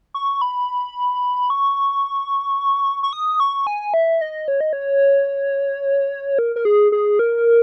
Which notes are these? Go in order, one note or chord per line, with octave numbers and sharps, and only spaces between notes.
C#6
B5
C#6
C#6
D#6
C#6
G#5
E5
D#5
C#5
D#5
C#5
A#4
A#4
G#4
G#4
A#4